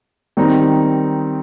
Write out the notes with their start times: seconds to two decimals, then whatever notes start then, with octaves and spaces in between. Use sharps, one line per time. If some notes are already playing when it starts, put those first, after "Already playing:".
0.37 D#3 G3 C4 D#4